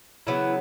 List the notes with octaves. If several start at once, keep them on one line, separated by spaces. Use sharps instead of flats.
C#3 E3 F#3 B3 E4